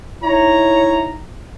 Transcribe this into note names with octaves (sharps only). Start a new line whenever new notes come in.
D#4 E4 C#5 A#5